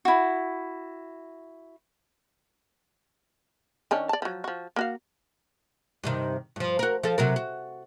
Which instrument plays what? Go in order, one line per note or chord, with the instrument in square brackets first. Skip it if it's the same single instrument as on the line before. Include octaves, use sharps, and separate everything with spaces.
[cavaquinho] E4 F#4
[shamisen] D#3 C#4 D4
D5 A5
F3 F#3
F3 F#4
A#3 F#4 F5
[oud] G2 C3 D#3
G2 F3
F#4 A#4
F3 A4
C3 F#3 A#4
F#4